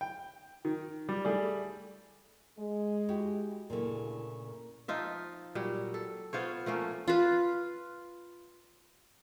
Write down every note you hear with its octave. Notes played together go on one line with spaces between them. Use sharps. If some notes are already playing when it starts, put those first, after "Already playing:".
G5
D#3
G3
G3 A3 G#4 D5
G#3
E4 F#4 G4
D2 A#2 C#3 A3 E4 A4
A#4
F3 D#4 F4 E5
A#2 F#3 G3
A4
B3 F4 C5 C#5
F3 A3 A#3 C#4
F4 B4